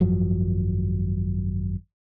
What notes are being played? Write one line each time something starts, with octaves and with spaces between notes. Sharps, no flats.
G#1 F#2 F3 F#3